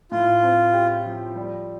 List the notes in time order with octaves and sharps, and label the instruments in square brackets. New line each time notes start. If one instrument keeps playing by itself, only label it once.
[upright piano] A2 [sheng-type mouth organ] F4
[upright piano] C4
G4
F3
G3